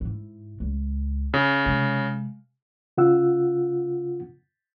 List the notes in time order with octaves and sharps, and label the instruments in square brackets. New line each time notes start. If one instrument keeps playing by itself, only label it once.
[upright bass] G#2 E4
C#2
[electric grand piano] C#3
[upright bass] C3 G#3
[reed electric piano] C#3 F4 F#5 E6